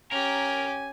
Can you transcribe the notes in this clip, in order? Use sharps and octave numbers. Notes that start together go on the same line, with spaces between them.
C#4 G4 A#4 G#5